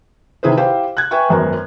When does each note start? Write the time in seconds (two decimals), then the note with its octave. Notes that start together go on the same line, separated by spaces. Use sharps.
0.43 C3 D#3 E4 G#4 B4 C5
0.57 E4 G4 C5 F5
0.97 F#6 G#6
1.11 B4 E5 G5 G#5 C#6
1.29 G#1 F#2 B3 A#4